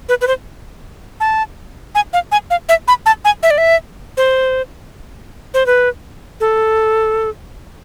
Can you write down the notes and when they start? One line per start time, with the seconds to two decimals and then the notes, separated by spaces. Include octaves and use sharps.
0.09 B4
0.21 B4
0.27 C5
1.20 A5
1.95 G#5
2.13 F5
2.32 G#5
2.50 F5
2.69 E5
2.88 B5
3.06 A5
3.25 G#5
3.43 E5
3.51 D5
3.58 E5
4.17 C5
5.54 C5
5.66 B4
6.40 A4